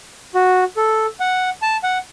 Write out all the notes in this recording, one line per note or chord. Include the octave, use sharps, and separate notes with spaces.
F#4
A4
F#5
A5
F#5